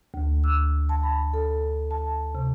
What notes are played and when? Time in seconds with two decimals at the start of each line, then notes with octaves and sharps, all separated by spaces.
0.14 D2
0.44 E6
0.89 A5
1.03 B5
1.34 A4
1.91 A5
2.35 C3